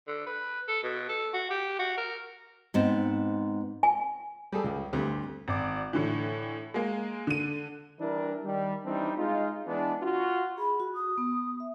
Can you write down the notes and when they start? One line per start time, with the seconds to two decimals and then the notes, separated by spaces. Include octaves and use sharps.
0.07 D3
0.26 B4
0.68 A4
0.83 B2
1.09 A4
1.34 F#4
1.50 G4
1.79 F#4
1.97 A#4
2.74 G#2 B3 C4
3.83 G#5
4.52 G3 G#4 A4
4.64 C#2
4.93 D2 G2 C4 G4
5.48 G#1 D5 D6
5.93 A2 D3 E3
6.74 G#3 A#3
7.27 D3 D#7
7.99 E3 G3 D4 E4 A#4
8.44 D#3 G3
8.84 E3 G3 C4 D4 D#4
9.17 G#3 D#4 F4
9.67 E3 G#3 B3 D4
10.03 F4 F#4
10.58 G#4 B5
10.80 F#4
10.94 D#6
11.18 B3
11.60 E5